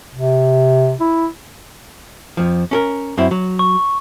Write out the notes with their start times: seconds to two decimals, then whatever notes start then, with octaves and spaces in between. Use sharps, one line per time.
0.15 C3
1.00 E4
2.37 F2 F3
2.71 C#4 A4 A#4
3.18 F#2 C4 E4
3.31 F#3
3.59 C#6